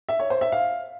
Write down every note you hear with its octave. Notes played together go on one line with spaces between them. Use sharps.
E5
C#5
C5
E5
F5